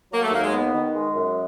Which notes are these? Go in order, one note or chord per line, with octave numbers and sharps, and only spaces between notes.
F#3 A#3
A3
D#2 A#3
G#3
B3
D#3
G#3
F#2